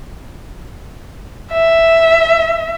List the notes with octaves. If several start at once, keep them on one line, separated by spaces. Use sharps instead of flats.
E5